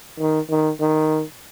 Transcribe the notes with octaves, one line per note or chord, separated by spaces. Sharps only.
D#3
D#3
D#3